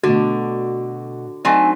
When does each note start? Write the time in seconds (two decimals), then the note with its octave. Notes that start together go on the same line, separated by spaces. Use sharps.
0.03 B2 D3 A3 D4 F#4
1.45 F#3 A3 C4 D4 D#4 G#5